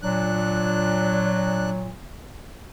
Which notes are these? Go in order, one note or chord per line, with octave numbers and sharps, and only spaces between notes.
A#2 F#3 D4 F#6